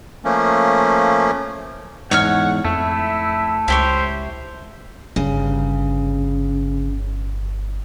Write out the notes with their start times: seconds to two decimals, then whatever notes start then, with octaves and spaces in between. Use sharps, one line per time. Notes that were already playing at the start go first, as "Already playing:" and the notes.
0.24 F3 A3 A#3 C#4
2.11 E2 G#2 C#5 F#5 C#6 F6
2.65 F2 A3 E4
3.68 C#2 E4 G4 C5 C#5
5.16 G1 C#3